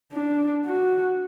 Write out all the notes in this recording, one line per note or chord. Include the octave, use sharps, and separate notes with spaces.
D4
F#4